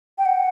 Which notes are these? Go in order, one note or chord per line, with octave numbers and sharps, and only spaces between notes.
G5
F#5